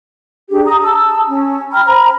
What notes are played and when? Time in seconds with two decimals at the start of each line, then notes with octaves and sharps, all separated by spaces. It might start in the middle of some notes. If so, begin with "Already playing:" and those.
0.50 D4 G4 G#4
0.65 A#5 D#6
0.83 A5 E6
1.27 C#4
1.72 G5 A#5 B5 F6
1.86 C5 A#5 B5